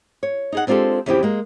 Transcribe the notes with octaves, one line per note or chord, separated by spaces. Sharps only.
C#5
D#4 G#4 F#5
G#3 C4 D4 F4 G4 A4
E2 C#3 F3 C4 E4 G4
G#3 A#3